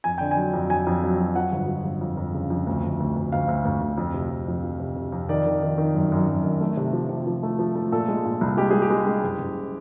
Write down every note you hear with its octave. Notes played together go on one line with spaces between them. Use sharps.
F2 G#5
D3 G5
G#5
F#3
F2
F2 G#5
F2
F#3
F#3
F3 F#5
G1
F3
G1
F2
F2
C#3
F2
D2
D2
D2
D2
D2 F5
D2
D2
D2
F2
C3
F2
F2
F3
C3
C3
F2
D#3 D5
D#3
D#3
D#3
F#2
F#2
F#2
D#3
A3
C3
F3
C3
F3
A3
F3
A3
A#2 A4
G#3
A#2
C2
G#3 G4
G#3 G#4
G4
G#3
G#3
F#1
F#1